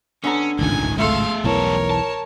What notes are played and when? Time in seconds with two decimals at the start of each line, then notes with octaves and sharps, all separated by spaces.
0.24 D3 B3 C#4 A#5
0.59 D1 G#1 C#2 A#2 D#3 G#5
0.98 G#3 A3 A4 E5 F5 C6
1.44 B1 E2 E3 G3 A#4 C#5 A5
1.90 A5